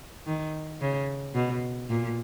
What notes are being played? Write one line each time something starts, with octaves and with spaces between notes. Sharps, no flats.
D#3
C#3
B2
A#2